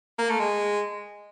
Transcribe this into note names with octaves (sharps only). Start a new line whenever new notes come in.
A#3
A3
G#3